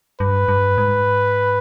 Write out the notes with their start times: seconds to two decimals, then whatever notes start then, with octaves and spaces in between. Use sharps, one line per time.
0.20 G2 B4
0.49 G2
0.78 G#2